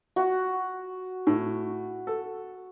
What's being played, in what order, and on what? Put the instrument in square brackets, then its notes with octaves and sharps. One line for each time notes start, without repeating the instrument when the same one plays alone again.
[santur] F#4
[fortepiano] A2
A4